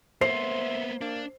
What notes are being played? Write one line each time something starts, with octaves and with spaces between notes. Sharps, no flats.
A#3 B3 C5 E5 C7
A#3 D4